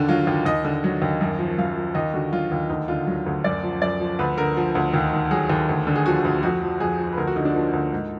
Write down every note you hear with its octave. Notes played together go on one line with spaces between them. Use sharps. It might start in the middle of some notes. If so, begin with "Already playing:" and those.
Already playing: D#2 D3 D4
F#3 F4
D#2
D#2 D#5
D3
F#3
D#2
F#2
F3
F#2 F5
F3
D#2 D#5
D3 F#4
F#3 F4
D#2
D2 D#4
D3 F4
F#3
D2
F#2 D5
F3
F#2 D5
F3
D2 B4
D3 A#4
F3
D2
D#2
D#3
F#3 G#4
D#2
D2
D3
G#4
F3 F#4
D2
F2 F#4
F3
F2 G#4
F3
B4
D2 A#4
F#4
D3 D#4
D4
F3 A#3
D2
G#2